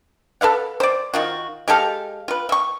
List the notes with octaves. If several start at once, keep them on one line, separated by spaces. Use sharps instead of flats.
A4 B4 F5 F#5
C5 D5
D#3 F4 F#4
G#3 G4 A4 F5
F4 B4
E5 C#6